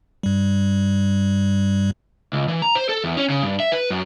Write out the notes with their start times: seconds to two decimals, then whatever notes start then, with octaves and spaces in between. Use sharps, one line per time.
0.23 G2 G3
2.33 C#2
2.48 E3
2.62 A#5
2.75 C5
2.89 A4
3.04 E2
3.17 C#4
3.30 C#3
3.43 G2
3.60 E5
3.72 B4
3.90 F#2